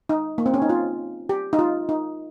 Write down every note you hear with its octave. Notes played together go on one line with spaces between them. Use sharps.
D#4
A#3
C4
C#4
D#4
F4
G4
D#4
F4
D#4